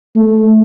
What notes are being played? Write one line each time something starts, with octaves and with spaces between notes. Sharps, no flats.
A3